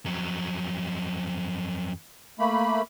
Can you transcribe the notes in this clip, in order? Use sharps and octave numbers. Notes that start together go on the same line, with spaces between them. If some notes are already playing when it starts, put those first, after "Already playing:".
F2 F#3
A3 A#3 B5